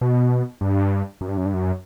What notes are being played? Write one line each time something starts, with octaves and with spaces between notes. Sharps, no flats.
B2
G2
F#2
G2
F#2
G2
F#2